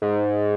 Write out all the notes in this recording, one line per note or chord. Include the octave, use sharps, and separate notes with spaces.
G#2